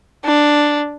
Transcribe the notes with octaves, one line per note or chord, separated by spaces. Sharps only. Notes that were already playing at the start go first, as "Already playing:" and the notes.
D4